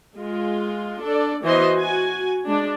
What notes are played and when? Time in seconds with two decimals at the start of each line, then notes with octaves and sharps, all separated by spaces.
0.18 G#3 F4
1.02 D4 A4 D5
1.44 E3 B3 F#4 C5 D#5 C6
1.75 F#4 G#5
2.45 G#3 D4